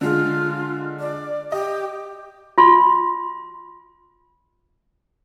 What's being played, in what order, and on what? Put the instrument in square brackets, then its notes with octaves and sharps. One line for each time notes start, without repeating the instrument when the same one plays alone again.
[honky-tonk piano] D3 G#3 [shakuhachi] F4
[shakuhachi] D5
[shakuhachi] G4 [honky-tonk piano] D#5
[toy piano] F4 C6